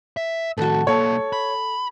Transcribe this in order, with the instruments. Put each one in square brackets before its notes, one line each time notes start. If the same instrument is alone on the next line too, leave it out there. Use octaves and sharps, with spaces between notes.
[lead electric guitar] E5
[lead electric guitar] A2 D#3 [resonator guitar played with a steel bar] F#4 A4
[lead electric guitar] B1 A#3 [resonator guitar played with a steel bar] A4 [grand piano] C#5
[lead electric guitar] B5